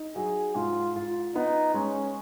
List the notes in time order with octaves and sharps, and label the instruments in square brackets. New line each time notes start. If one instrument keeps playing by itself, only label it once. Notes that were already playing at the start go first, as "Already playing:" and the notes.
Already playing: [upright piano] D#4
[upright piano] F#3 [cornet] G#4
[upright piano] G#2 [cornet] F4
[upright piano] F4
[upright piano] B3 [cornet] D#4
[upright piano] G#3 [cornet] C#4